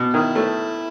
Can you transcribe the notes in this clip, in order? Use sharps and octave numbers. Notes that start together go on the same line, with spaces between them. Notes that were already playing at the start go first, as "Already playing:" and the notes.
Already playing: B2
D#3 E4
A3